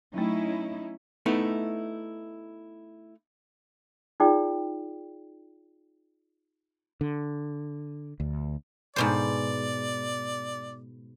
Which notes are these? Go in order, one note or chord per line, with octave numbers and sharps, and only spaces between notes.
F#3 A3 C#4 D#4 E4
A3 B3 D#4 E4
D#4 F4 G#4 D5 G5
D3
D2
G#2 B2 C5 D5